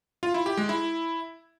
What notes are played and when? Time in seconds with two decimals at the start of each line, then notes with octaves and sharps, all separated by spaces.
0.23 F4
0.34 E4
0.46 G4
0.57 G#3
0.69 E4